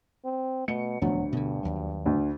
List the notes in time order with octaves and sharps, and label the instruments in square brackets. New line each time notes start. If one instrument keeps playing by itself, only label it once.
[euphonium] C4
[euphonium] B2 [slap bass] A3 [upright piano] C#7
[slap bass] D#1 F3 B3 [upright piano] D2 [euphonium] F#3
[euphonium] G2 [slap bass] B2 D3
[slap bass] D#2 F#3
[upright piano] D2